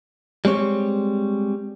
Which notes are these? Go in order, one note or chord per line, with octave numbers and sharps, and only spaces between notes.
G3 G#3 C4 C#5